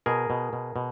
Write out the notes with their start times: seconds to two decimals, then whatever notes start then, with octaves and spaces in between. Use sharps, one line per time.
0.06 B2 G#4 A#4
0.30 B2
0.53 B2
0.76 B2